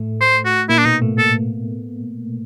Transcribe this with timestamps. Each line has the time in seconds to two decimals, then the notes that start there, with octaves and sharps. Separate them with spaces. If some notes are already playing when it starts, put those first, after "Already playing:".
Already playing: A2 A3
0.21 C5
0.45 F#4
0.69 A#2 A#3 E4
0.78 D4
0.85 B2 B3 D#4
1.02 A2 A3
1.18 A#3 A4
1.26 A3